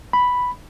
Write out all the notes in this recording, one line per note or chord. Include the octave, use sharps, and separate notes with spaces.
B5